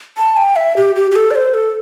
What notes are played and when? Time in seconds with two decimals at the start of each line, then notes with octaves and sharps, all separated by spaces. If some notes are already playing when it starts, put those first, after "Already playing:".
0.18 A5
0.37 G5
0.56 E5
0.77 G4
0.96 G4
1.11 G4
1.16 A4
1.31 D5
1.35 C5
1.54 A4